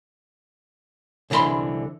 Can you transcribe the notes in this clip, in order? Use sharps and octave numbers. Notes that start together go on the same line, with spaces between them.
C2 D3 E3 D5 B5 C6